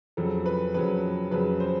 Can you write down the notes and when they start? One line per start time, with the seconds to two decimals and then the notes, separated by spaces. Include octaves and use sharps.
0.17 F2 C#3 F#3 A4
0.46 B4
0.74 F2 C#3 F#3 B4
1.32 F2 C#3 F#3 B4
1.60 C5